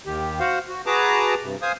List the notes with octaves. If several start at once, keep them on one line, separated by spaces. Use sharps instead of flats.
D#2 D#3 G4
F#4 C5 F5 F#5
F#4
F#4 G#4 B4 A5 A#5 D6
G2 C3
C5 F5 G#5 D#6